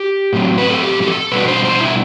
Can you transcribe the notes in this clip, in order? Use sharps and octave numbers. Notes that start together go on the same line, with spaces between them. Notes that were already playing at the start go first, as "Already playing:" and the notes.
Already playing: G4
A2 F#3 C4
B4
A4
G4
G4
A4
B2 G3 D4 B4
C5
C5
E4